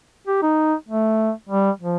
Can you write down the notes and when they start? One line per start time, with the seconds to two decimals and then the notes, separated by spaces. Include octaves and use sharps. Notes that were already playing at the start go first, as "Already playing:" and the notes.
0.27 G4
0.42 D#4
0.89 A3
1.49 G3
1.80 F3